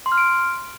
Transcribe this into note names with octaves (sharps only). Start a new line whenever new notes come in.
C6
F6
D7